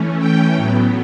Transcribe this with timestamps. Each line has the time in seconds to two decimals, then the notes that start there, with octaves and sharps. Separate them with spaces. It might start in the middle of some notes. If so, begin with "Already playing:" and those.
Already playing: E3 A3 C#4
0.19 G5
0.56 A2 F#3 B3